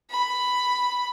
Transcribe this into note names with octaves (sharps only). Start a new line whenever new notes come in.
B5